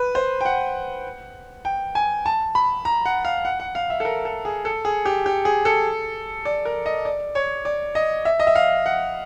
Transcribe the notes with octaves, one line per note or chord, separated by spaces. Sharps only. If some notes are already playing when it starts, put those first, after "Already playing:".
Already playing: B4
C5
G5
F#5
G5
G#5
A5
B5
A#5
F#5
F5
F#5
F#5
F5
E5
A4
A#4
A4
G#4
A4
G#4
G4
G4
G#4
A4
D5
A#4
D#5
D5
C#5
D5
D#5
E5
D#5
E5
F5
F#5